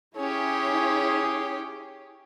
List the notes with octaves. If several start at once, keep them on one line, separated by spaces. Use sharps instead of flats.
C#4 E4 G4 G#4 C#5